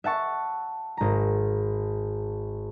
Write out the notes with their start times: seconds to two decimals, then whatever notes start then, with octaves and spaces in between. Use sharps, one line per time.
0.04 E5 F#5 A5 C#6
0.97 G#1 A#5